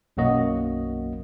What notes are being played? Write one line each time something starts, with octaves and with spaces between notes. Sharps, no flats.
B1 F#2 F#3 A#3 F#4 D#5